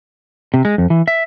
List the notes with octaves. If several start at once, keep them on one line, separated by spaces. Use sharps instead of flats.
C3
G#3
F2
E3
E5